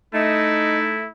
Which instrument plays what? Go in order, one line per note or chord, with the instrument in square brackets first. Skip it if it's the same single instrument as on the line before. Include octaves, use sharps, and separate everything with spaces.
[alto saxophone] A3 [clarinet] D#4 [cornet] E4 [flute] D#5